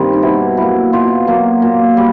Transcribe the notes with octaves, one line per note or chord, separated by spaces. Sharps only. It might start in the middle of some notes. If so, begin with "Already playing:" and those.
Already playing: G2 D#3 G3 C4
D#4
B2 E4
F#3 A#3 E4
B2 F4
F#3 A#3
A#2
G3